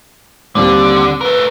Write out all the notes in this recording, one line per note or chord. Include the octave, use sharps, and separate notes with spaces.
D#2 D3 G3 C4
A3 A#4 B4